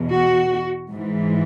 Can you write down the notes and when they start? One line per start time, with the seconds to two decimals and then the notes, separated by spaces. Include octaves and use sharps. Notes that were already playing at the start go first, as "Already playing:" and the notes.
Already playing: E2 B2
0.11 F#4
0.91 G#2 E3